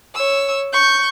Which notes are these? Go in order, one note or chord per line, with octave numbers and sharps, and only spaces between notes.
C#5 E6
C#6 G6